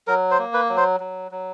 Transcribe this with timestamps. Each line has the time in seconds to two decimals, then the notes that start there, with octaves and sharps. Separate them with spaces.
0.07 F#3 A#4
0.31 C5
0.39 A#3
0.54 B4
0.70 F#3
0.77 C5
1.00 F#3
1.31 F#3